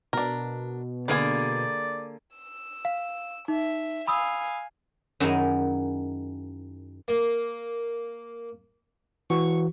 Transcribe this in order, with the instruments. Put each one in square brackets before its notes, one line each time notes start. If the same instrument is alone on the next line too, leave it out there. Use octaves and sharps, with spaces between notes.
[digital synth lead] B2 [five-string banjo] D4 A#4
[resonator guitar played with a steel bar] D3 A#3 G#4 [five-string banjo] B4 G#5 [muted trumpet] D5
[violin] E6
[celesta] F5
[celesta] D#4 [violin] E5
[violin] F5 G#5 [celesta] B5 D#6 E6
[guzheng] F#2 D#3 D#4 E4 G#4 D#5
[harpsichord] A#3
[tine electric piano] E3 F#4 [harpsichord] C#6